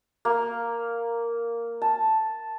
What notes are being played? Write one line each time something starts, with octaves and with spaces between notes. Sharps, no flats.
A#3
A5